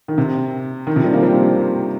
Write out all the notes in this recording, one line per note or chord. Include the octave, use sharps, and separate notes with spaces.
D#3
C3
D#3
C3 F3
D#3 G3
F3 A#3
G3 C4